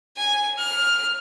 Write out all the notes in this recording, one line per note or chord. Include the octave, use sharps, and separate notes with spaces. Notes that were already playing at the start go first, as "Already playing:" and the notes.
G#5
F6